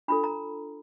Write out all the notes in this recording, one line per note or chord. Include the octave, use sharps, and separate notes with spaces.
D4 F4 A4 B5
A#5